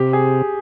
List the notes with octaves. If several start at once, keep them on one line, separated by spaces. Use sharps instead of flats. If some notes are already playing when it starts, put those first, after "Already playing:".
Already playing: C3 G4
G#4